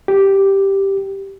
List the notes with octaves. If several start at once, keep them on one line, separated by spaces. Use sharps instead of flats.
G4